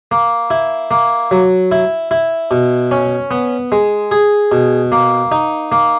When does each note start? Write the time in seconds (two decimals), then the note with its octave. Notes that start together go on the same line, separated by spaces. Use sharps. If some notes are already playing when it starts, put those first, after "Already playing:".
0.11 A#3
0.51 E4
0.91 A#3
1.31 F#3
1.72 E4
2.11 E4
2.51 B2
2.91 C#4
3.31 B3
3.72 G#3
4.11 G#4
4.52 B2
4.92 A#3
5.32 D#4
5.72 A#3